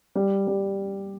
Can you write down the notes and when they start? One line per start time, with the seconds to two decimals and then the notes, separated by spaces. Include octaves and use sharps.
0.15 G3
0.47 G3